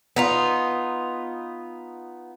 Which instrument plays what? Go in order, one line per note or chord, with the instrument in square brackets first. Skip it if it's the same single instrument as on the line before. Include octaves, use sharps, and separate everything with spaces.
[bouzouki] B3 D#4 F4